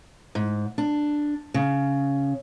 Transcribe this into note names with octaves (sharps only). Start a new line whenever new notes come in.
G#2
D4
C#3